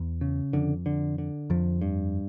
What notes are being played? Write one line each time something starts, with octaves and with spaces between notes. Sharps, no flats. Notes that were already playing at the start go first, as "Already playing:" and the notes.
Already playing: E2
C#3
F2 D3
D3
D3
F2 F3
G2